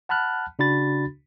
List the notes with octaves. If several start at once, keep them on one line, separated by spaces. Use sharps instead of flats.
F#5 A5 B5 F6 F#6
C#3 D4 F#4 B5 A6